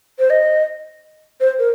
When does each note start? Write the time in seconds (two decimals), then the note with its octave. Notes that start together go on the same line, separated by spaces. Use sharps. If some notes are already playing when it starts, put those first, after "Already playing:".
0.19 C5
0.30 D#5
1.40 C5
1.59 A#4